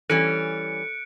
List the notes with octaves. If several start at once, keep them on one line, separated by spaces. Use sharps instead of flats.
E3 G3 C#4 A4 F#6 C#7 D7